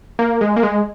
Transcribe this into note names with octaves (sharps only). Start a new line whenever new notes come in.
A#3
G#3
A#3
G#3